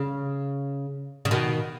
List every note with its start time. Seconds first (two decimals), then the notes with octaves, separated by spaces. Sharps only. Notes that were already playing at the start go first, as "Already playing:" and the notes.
Already playing: C#3
1.25 C#3
1.31 B2 D#3